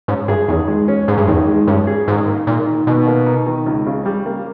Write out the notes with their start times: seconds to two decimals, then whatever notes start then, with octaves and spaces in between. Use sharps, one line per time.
0.08 G#2 C#4
0.28 G2 G#4
0.48 E2 D#3
0.68 G#3
0.88 C#4
1.08 G#2 G#4
1.17 G2
1.28 E2 D#3
1.48 G#3
1.67 G2 C#4
1.87 G#4
2.08 G#2 D#3
2.27 A#3
2.47 A#2 D#4
2.67 D#3
2.87 B2 D#3
3.07 A#3
3.26 D#4
3.46 D#3
3.66 C#2
3.86 C#3
4.06 G3
4.26 A#3